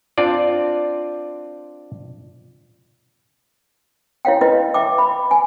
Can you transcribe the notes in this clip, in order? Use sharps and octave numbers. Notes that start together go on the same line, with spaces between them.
C4 D4 F4 D5
E4 C#5 F5 G5
E4 B4 D#5
E5 G5 D6
B5
G#5